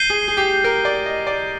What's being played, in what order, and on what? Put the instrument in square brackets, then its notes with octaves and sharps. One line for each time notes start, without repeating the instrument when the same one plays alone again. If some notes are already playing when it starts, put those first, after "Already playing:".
Already playing: [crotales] G6 C7 D#7 G7
[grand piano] G#4
G#4
G4
A#4
D5
D#5
D5